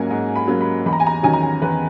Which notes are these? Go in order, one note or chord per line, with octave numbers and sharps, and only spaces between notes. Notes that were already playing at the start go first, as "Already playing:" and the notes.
Already playing: G#2 F#3 A#3 C#4 G#5 A#5
G#2
B5
F#3 A#3 C#4
B5
E2 B5
A#5
G#5
A#5
D#3 F#3 C#4 G#5
A#5
G#5
E2 B4